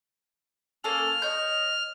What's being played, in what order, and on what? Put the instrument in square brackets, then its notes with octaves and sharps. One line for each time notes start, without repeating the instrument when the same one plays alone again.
[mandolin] A#3 C#4 A4 [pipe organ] F6
[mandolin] C#5 G6 [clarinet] D#5